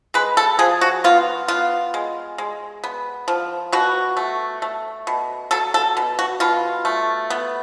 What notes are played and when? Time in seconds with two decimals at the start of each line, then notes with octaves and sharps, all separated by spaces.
0.14 G#3 B4
0.37 A4
0.59 F3 G#4
0.81 F#4
1.04 B3 F4
1.48 B3 F4
1.94 G#3
2.38 G#3
2.84 B3
3.28 F3
3.72 B2 F#4
4.17 A3
4.62 A3
5.07 B2
5.51 F#3 A4
5.74 A4
5.97 B2
6.19 F#4
6.40 B2 F4
6.85 A3
7.30 B3